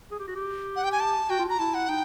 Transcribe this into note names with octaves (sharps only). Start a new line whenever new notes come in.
G#4
G4
F#4
G4
F#5
G5
G#5
A5
F#4 G5
F4
F#4 A#5
E4 A5
F#5
D#4 G5